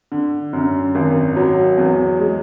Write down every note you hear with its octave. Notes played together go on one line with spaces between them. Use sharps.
D3
F#2
G#1
F#3
E2
G#3